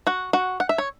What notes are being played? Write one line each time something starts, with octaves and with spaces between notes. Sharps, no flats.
F#4 F#5
F#4 F#5
F#5
E5
C#5